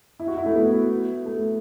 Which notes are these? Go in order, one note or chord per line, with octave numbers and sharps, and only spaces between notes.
E4
F#4
E4
A3
B3
A3